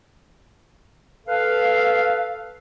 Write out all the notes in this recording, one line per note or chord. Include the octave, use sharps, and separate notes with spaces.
A4 B4 F5